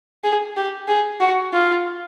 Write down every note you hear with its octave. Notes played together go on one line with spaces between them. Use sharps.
G#4
G4
G#4
F#4
F4